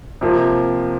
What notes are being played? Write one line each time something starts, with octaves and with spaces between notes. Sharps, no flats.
C3 F3 A#3